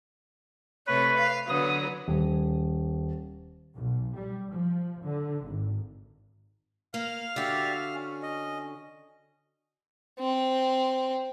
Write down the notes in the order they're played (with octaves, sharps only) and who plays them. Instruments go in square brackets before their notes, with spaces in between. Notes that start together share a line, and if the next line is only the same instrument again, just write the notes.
[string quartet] C3 A3 C#5 [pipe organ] B4
[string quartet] F5
[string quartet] D3 F#3 B3 [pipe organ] D#6
[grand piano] D#1
[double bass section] B1
G3
F3
D3
G#1
[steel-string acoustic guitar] A#3 [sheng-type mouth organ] F5 F6
[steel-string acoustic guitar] D3 F#4 [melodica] G4 D5 E5
[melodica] C#4
[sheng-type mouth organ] D#5
[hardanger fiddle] C4